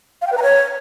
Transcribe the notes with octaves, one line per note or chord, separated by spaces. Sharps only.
F5
G5
B4
A#5
C#5